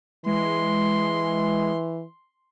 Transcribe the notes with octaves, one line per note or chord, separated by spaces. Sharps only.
E3 G#3 C6